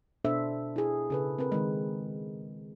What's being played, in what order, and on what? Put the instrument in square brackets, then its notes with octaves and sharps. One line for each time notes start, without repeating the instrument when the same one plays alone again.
[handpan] B2 D4 A4 C5 E5
E4 G#4
C#3 A4 B4
C4 A#4 B4
D#3 G#3